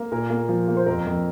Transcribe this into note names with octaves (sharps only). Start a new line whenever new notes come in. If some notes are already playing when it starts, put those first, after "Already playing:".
Already playing: A#3
A#2 A#4
A#3
F3
A#3
C5
F2 A#4
F2